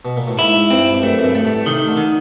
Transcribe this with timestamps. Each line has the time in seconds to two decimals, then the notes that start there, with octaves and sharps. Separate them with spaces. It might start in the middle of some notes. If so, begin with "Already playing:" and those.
0.05 B2
0.17 A#2
0.27 A2
0.39 G#2 E4
0.70 G2 C4
0.95 G2
1.03 F#2 A3
1.19 F#2
1.24 G2
1.35 A3
1.45 A2
1.66 C3 D#3
1.88 D3
1.97 D#3